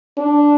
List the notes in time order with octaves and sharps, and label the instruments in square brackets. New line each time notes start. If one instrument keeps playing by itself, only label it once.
[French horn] D4